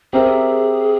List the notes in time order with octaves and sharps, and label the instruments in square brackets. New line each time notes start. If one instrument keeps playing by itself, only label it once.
[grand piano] C4 G4 A#4 E5 [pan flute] G#4